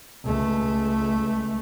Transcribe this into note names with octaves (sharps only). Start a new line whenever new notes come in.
C#2 A3